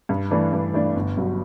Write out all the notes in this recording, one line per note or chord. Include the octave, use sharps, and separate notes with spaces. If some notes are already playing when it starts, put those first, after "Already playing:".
G2
E3 A3 D4
G2
E3 A3 D4
G1
G2 F#3